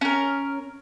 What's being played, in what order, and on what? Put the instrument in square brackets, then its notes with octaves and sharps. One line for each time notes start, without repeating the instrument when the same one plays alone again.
[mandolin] C#4 A#4